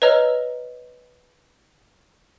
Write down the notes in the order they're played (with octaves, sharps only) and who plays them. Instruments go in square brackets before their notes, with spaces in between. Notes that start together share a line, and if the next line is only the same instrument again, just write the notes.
[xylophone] B4 C#5 D#5 A#5 E6 F6